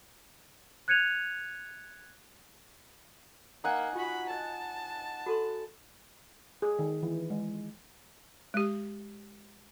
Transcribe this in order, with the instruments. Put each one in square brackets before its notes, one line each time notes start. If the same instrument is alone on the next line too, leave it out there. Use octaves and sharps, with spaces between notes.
[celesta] F#6 G#6 C#7 D#7 F7
[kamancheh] A#3 [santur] D#4 F#5 G#5
[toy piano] F4 [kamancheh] F#4 B5
[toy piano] D#5 [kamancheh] A5
[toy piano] F#4 A4 C6
[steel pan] G#4
D#3
E3
G#3
[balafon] G#3 G4